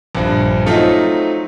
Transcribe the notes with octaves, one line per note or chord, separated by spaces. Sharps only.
A#1 G2
F#3 A3 C4 D#4 F4 A4